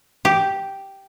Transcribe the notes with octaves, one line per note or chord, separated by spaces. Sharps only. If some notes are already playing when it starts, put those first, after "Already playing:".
G4